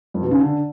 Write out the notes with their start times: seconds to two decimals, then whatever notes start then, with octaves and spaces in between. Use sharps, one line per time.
0.14 F2
0.23 B2
0.31 C#3
0.40 D3